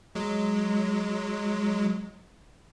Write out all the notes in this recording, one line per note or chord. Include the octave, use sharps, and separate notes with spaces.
F#3 G#3